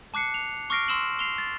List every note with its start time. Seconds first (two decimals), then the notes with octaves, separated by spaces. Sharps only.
0.14 A5 D6 F#6 C7 C#7
0.34 F7
0.70 C#6 D6 F6 A#6 C7 D7
0.88 C6 E6 E7 F#7
1.19 C7 F7 G7
1.38 A6